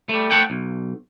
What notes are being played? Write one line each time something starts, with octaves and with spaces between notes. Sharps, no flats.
G3 A3
A3 A4 F#5 G5
B1